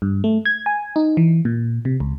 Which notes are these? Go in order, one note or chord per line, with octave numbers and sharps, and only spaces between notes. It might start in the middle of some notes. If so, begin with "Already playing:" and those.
G2
A3
G#6
G#5
D#4
E3
A#2
C3
C#2